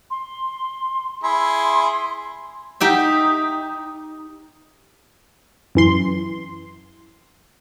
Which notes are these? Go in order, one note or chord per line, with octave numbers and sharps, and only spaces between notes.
C6
E4 G#4 C6
D#4 G4 E5
F#2 E3 C6